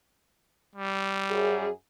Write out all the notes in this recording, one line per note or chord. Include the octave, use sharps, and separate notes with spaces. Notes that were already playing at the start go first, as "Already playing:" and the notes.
G3
F#2 G#4